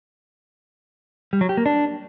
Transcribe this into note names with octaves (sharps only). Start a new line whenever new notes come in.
G3
F#3
G4
A#3
D4